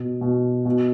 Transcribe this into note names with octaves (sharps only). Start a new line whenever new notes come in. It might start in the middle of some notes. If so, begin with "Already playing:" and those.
Already playing: B2
B2
B2